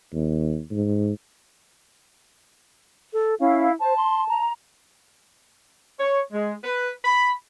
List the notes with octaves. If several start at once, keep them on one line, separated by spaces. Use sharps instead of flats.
D#2
G#2
A4
C#4 E4 F5
C5 A5
C6
A#5
C#5
G#3
B4
B5